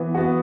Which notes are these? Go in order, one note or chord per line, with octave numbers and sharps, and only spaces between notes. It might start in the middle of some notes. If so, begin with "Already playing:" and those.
Already playing: E3 B3
B3 F#4